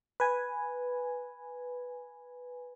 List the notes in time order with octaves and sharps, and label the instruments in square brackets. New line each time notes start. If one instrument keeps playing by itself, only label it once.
[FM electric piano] B4 G#5